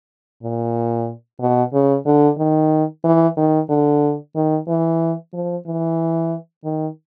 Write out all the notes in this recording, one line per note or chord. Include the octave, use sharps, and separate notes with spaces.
A#2
B2
C#3
D3
D#3
E3
D#3
D3
D#3
E3
F3
E3
D#3